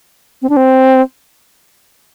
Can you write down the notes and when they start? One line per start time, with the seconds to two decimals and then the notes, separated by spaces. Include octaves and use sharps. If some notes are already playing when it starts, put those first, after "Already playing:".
0.42 C4
0.49 D4
0.57 C4